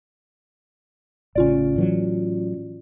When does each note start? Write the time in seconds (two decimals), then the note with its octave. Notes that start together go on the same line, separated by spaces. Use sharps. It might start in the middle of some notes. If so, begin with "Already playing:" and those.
1.35 A1 C#3 C#4 F4 D5
1.76 A2 E3 F#3